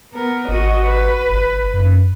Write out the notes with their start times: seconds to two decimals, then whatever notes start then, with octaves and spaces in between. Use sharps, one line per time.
0.13 B3 A#4
0.49 G#1 F#4 D#5
0.86 B4
1.30 G1
1.74 F#2